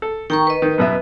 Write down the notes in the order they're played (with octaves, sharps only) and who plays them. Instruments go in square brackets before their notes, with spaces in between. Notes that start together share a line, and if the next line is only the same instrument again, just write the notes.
[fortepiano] A4
[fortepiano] D#3 [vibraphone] G5 A#5 C#6
[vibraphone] B4 D#5
[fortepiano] D#3
F#2 B2 E5